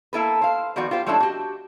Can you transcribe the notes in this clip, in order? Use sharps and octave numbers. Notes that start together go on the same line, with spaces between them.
A#3 E4 A4 B4
C5 F5
D#3 F3 B3 F#4 D5
F4 G4 C5
F3 G#3 A3 C#4 D4 E4
F#4 G4